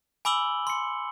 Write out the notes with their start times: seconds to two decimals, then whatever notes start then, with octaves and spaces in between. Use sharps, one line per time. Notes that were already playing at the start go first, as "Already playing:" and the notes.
0.25 G#5 B5 D6 E6 F#7 G7
0.67 C6 C#7